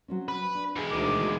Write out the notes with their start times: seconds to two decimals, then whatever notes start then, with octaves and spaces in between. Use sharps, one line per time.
0.08 F#3 C4 C#4
0.28 B4
0.55 D4
0.76 E2 G#3
0.91 D2 D#3 D6